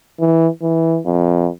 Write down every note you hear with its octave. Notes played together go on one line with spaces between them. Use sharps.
E3
E3
F2